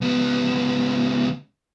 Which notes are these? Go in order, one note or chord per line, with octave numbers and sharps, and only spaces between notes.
C#2 B3